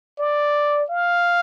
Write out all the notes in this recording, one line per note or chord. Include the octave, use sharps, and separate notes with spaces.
D5
F5